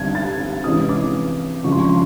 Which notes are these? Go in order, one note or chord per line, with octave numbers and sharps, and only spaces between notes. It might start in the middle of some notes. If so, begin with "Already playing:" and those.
Already playing: D3 G3 C4 G#6
A6
C3 E3 G#3 C#4 E4 D#6
D6
C#3 F3 G#3 C#6
C6
C#6
C6